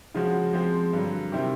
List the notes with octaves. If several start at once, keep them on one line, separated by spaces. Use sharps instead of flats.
C#3 F3 G#3 C#4 F#4
F3 G#3 C4
G2 D3 F#3
C3 D#3 G3 C4 E4